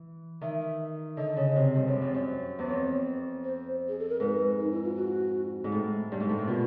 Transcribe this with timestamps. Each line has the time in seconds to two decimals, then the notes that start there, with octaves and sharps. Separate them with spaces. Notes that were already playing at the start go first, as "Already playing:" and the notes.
Already playing: E3
0.41 D#3 E5
0.60 E5
1.17 D3 D#5
1.37 C#3
1.56 C3
1.75 G2
1.87 F#2
2.02 F2
2.14 F#2
2.59 E2 C5
2.68 F2 C#5
3.45 C5
3.89 G#4
3.99 A4
4.09 A#4
4.20 G#2 B4
4.59 D#4
4.71 E4
4.84 F4
4.96 F#4
5.64 G#2
5.72 A2
6.12 G2
6.20 G#2
6.29 A2
6.39 A#2
6.48 B2 F4